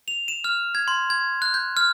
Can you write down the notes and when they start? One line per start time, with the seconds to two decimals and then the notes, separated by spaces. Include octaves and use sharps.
0.08 F7
0.28 E7
0.44 F6
0.75 G#6
0.88 C6
1.10 G#6
1.42 F#6
1.54 G6
1.77 F6